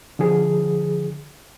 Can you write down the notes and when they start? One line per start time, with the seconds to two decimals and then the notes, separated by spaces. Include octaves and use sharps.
0.19 D3 F3 G#4